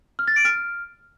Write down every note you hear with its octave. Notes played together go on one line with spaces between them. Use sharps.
F6
A6
D7
F6